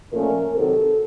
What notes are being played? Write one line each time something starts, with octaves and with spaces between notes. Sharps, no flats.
A#2 F3 A3 C#4 A#4
C3 D#3 F#3 A4